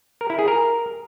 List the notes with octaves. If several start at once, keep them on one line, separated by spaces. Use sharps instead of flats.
A#4
E4
G#4
A#4